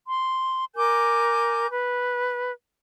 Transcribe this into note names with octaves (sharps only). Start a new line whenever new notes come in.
C6
A#4 G#5 D6 G6
B4